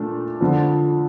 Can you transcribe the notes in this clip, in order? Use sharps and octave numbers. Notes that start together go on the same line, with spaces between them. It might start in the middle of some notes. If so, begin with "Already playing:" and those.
Already playing: A#2 A3 D4
F2 D3 F3